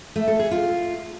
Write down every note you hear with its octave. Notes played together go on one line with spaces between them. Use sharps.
A3
A4
G#4
F4